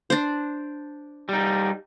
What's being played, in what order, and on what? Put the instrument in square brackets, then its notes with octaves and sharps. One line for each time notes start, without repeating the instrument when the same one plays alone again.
[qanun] D4 C5
[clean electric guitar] G3 D#4